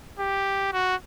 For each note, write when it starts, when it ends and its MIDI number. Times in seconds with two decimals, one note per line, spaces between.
0.19 0.70 67
0.73 0.96 66